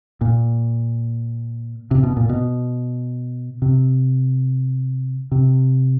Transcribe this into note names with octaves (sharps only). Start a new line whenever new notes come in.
A#2
C3
B2
A#2
B2
C3
C3